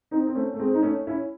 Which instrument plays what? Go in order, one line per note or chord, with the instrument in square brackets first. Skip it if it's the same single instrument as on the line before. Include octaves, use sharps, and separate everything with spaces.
[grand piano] C4 D#4
C4
A3 C#4
A3
G#3 C4
D#4
A3 C#4
C#4 E4